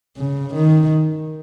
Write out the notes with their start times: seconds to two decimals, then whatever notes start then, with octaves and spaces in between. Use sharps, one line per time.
0.17 C#3
0.54 D#3